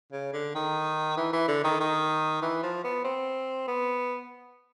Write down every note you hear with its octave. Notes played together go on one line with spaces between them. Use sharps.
C#3
D3
D#3
E3
E3
D3
D#3
D#3
E3
F3
B3
C4
B3